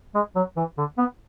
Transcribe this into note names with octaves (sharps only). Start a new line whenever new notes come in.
G#3
F#3
E3
D3
B3